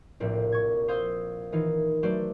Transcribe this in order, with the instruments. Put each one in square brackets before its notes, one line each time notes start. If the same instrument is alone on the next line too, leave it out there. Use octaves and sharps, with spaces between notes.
[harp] F1 A#1 A2 C4
C#6 G#6
C5 F5 C6 D#6 E6 G6
D#3 E3 D#4 F4
F#3 A3 F#4 B4 C5 D5